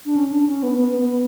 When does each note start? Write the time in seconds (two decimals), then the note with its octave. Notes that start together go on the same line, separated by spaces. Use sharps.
0.06 D4
0.16 C#4
0.32 D4
0.43 D4
0.47 C#4
0.63 B3
0.78 B3
0.99 B3